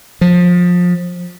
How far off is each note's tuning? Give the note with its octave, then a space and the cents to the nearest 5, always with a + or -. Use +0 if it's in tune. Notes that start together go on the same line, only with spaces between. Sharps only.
F3 +25